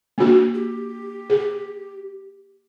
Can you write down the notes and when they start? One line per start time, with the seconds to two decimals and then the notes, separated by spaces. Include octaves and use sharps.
0.18 A#3 D4 F#4
0.54 G4
1.30 G#4